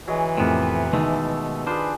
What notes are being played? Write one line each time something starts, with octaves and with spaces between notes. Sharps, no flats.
E3 F#3 G#3
F2 A2 C3 B3 G4 A#4
B2 D#3 G#3 A3 E6
D4 F4 G#4 B4 C5